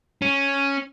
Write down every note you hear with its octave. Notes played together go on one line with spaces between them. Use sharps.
C#4